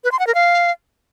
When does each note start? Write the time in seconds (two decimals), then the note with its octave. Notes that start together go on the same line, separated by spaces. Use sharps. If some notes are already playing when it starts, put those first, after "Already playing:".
0.04 B4
0.12 C6
0.19 F#5
0.27 A#4
0.35 F5